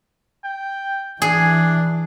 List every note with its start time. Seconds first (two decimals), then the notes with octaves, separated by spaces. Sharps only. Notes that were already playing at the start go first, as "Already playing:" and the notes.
0.44 G5
1.22 E3 D4 G#4